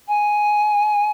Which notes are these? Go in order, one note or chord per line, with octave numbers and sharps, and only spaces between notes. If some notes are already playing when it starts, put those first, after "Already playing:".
G#5